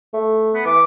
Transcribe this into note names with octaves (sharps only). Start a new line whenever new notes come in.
A3
B3
E3 D6